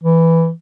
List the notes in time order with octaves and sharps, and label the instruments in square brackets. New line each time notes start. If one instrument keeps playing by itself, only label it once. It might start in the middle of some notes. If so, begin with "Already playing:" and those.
[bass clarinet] E3